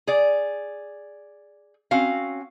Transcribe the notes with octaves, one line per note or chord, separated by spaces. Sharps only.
G#4 D5
C4 C#4 F#4 F5